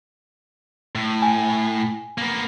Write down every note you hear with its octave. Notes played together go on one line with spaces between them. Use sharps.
A2
G#5
A#3 B3